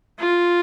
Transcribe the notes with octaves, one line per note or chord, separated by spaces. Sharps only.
F4